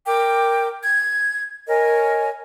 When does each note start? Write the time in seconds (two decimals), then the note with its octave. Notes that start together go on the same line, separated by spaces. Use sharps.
0.06 A#4 G5 D6
0.83 G#6
1.68 A#4 C#5 D#5 G#5